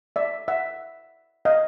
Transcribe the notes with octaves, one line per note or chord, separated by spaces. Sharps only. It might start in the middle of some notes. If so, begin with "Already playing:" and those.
D5 E5
E5 F#5
D#5 F5